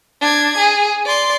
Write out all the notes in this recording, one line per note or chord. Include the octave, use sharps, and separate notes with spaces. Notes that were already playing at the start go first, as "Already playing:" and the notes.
D4 G#6
G#4
D5 C6